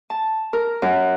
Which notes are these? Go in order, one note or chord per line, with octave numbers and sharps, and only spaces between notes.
A5
A#4
F#2